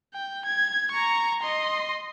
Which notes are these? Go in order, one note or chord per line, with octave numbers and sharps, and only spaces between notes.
G5
G#6
A#5 C#6
D#5 C6